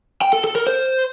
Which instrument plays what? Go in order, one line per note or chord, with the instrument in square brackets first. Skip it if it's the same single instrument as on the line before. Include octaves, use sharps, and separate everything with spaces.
[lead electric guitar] G5
A4
A4
A#4
C5